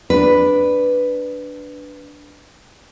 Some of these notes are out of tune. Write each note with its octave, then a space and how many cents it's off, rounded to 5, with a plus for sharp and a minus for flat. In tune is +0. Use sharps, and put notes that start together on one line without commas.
D4 +0 B4 +0